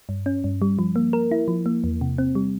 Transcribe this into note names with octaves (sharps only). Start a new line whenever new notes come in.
G2
C#4
G2
G3
F3
A#3
A#4
E4
F3
A#3
E2
C3
C4
G3